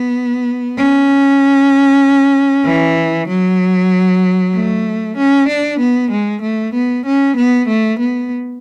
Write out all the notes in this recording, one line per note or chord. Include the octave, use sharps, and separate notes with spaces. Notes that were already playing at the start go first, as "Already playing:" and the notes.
Already playing: B3
C#4
E3
F#3
A3
C#4
D4
B3
G#3
A3
B3
C#4
B3
A3
B3